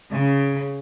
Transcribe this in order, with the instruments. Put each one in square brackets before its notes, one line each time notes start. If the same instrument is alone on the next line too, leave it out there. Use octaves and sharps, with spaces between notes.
[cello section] C#3